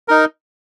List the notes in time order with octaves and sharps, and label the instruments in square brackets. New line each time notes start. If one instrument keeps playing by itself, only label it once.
[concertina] D#4 A#4